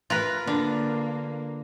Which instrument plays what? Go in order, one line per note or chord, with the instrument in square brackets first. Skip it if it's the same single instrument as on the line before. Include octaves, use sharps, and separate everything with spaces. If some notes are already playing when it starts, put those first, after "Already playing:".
[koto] F4 A#4 B4
[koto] D3 [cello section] A#3